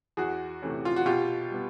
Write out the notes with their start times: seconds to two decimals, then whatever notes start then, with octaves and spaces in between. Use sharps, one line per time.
0.17 E2 F#4 G#4
0.62 C3 E3 A3 C#4
0.85 F4
0.96 F#4
1.05 B2 F4 G4
1.50 G3 B3